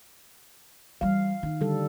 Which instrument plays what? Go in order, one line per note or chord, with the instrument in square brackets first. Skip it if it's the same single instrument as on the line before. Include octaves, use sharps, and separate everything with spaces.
[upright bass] E3 G3 [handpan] F5
[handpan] D#3 [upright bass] D#4
[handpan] D3 G3 A4